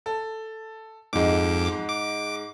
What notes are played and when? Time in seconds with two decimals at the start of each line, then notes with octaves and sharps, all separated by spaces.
0.06 A4
1.13 F2 G#2 G#3 D6
1.89 D6